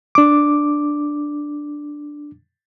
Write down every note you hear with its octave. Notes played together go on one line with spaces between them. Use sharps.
D4 D6